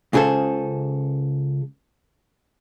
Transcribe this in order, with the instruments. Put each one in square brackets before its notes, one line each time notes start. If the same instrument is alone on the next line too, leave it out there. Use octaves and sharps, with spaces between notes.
[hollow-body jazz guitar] C#2 C#3 G#4 A4 C5